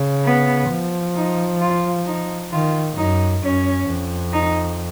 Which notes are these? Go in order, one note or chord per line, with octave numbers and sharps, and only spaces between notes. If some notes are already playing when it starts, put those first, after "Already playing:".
Already playing: C#3
B3
F3
D#4
F4
D#4
D#3 F4
F#2 D#4
F#2 C#4
F2
D#4